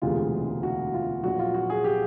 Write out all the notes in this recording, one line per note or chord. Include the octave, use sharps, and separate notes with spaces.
E1 D2 C3 E3 G#3 F4
F#4
F4
A#1 A#2 F#3 F#4
F4
F#4
G#4
G4